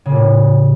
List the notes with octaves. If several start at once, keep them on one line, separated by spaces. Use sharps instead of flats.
C#3
A#2
A2